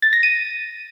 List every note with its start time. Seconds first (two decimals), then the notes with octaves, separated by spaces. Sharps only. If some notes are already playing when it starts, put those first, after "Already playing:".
0.02 A6
0.13 A#6
0.23 D#7